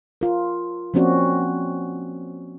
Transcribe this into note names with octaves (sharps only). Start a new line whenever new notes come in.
F4 A#4
F3 A#3 C4 C#4 F#4 D5